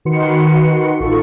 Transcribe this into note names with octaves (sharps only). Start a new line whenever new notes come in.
D#3 F#4 B4 C6 C#7
A1 D#4 F4 A4 C#6